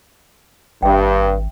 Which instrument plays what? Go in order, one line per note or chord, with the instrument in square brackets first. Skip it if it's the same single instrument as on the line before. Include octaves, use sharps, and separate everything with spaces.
[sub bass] G#1 [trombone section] G2 [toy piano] E5 G5